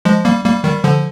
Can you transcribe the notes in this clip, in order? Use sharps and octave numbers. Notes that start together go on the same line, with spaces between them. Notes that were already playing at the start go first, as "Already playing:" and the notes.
F3 G#3
G3 A#3
G3 A#3
D#3 G3
D3 F3